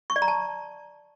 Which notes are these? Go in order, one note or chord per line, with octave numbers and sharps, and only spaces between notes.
C#6
D5
A#5
A5